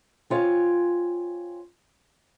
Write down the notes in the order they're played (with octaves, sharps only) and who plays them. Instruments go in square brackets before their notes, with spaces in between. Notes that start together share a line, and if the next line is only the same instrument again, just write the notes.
[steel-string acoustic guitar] C4 F4 C#5 G#5